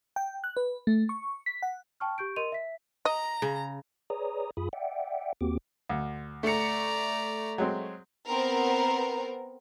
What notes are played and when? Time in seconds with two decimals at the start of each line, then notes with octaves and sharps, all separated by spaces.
0.16 G5
0.44 F#6
0.57 B4
0.87 A3
1.09 C#6
1.46 B6
1.62 F#5
2.00 G5 A5 C#6 F6
2.18 G4 C#6 G6 D7
2.36 A#4 D#5 C6 D#7 F7
2.52 E5 B6
3.05 D#5 A#5
3.42 C#3
4.10 G#4 B4 C#5 D5 A#5 D#6
4.57 F#2 F4 G#4 B5 D#6
4.73 D5 E5 F#5 G5
5.41 D#2 A#3 C4 F#4 G4 D6
5.89 D2
6.43 A3 D5 A#5 C#7
7.58 F#3 G#3 C4
8.28 B3 C4 A#4